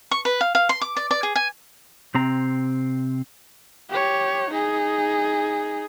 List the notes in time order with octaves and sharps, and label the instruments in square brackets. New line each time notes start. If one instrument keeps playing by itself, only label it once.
[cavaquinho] C#6
B4
F5
F5
C6
D6
D5
D5
G#4
G#5
[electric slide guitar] C3 C4 A#5
[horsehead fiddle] G4 C#5
D#4 G#4